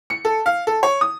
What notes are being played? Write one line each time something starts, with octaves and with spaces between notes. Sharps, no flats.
C#7
A4
F5
A4
C#5
D#6